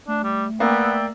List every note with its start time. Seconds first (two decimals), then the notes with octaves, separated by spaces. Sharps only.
0.08 A3 D4
0.23 G3
0.60 A#3 B3 D5 E5 G5